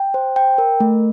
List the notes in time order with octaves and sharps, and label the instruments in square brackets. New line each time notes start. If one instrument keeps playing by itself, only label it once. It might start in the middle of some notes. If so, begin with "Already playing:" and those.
Already playing: [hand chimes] G5
C5
G5
A#4
A3